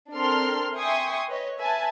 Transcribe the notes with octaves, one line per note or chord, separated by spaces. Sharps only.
C4 D4 A4 A#4 C6 F6
E5 G5 G#5 C6 C#6 D#6
B4 C#5 D#5
B4 E5 G#5 A5